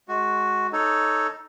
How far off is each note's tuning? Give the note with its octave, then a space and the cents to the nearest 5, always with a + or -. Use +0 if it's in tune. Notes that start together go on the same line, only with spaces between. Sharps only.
G#3 +25 F#4 +0
D#4 +0 A4 +0 C#5 +0